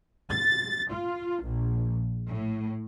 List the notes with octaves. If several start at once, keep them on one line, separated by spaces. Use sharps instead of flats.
A6
F4
A#1
A2